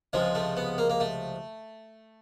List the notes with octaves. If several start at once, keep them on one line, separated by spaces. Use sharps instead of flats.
C#2 C3 F3 G#3
A3
B3
A#3
A#3
A3